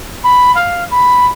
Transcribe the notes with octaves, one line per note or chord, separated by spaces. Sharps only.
B5
F5
B5